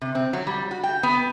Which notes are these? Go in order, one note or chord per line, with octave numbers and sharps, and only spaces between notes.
C3
C4
F#3
G3
F#4
G5
B3